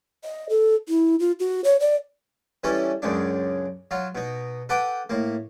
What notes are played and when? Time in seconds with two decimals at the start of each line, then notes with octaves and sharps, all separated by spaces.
0.24 D#5
0.49 A4
0.89 E4
1.20 F4
1.40 F#4
1.64 C#5
1.80 D5
2.64 E3 G3 C#4 E4 A4
3.02 C#2 F#2 C#3 D4
3.91 F#3 F4
4.15 B2 D#4
4.69 A4 B4 F#5 G5 D6
5.10 A2 A#3